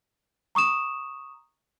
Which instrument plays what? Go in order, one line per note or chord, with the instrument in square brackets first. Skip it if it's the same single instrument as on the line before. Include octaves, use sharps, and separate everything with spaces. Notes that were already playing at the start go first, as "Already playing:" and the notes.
[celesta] A#5 C#6 D#6 E7